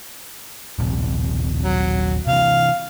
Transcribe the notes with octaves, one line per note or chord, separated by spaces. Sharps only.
D#1 A#1 C3
F#3
C3 E3 F5